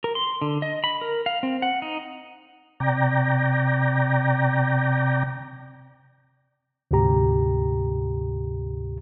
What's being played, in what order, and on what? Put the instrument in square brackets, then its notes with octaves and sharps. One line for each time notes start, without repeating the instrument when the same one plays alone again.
[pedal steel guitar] A#4
C6
D3
D#5
B5
A#4
F5
C4
F#5
D#4
[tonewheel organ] C3 D5 G5 A#5
[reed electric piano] D2 G#2 C3 G4 A#5